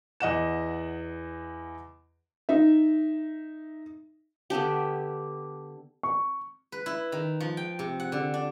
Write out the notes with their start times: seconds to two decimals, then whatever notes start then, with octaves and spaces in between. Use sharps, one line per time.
0.20 E2 D#5 F#5 E7
2.49 D#4 E5
4.50 D3 B3 D4 G4
6.03 C#6
6.72 B4
6.86 E4
7.12 D#3
7.40 F3
7.57 G5
7.79 C3
8.00 F#5
8.12 D3
8.34 D4